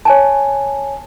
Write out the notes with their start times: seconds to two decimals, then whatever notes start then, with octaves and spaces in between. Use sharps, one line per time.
0.05 C#5 G#5 A5